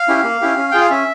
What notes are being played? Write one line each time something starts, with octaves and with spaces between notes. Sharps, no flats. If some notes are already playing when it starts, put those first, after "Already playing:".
Already playing: F5
C#4 E4 G4
A#3
C#4 E4 G4
C#4
F4 G#4 G5
F5
C#4 E5